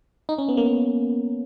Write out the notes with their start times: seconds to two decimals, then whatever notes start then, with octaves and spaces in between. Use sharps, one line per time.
0.29 D#4
0.38 C#4
0.49 B3
0.57 A#3